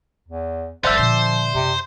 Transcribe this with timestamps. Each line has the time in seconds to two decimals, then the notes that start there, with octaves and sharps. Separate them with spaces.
0.28 E2
0.84 G#1 G2 A4 C5 D5 E5 F#5
0.98 A#2 D3 F3 C5
1.54 F#1 C3